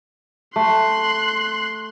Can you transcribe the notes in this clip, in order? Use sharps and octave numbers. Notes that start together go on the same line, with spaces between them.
A3 C6 F#6